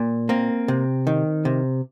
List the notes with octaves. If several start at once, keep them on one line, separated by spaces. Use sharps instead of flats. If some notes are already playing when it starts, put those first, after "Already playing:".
Already playing: A#2
A#3 C4
C3
D#3
C3